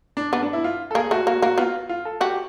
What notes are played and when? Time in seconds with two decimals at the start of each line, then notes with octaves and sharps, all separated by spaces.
0.17 D4
0.32 B3 D4
0.43 D4
0.53 E4
0.64 F4
0.91 A4
0.95 A#3 G#4
1.11 A3 F#4
1.27 A#3 F#4
1.42 A#3 F#4
1.58 B3 F4
1.89 F4
2.05 A4
2.21 F#4 G4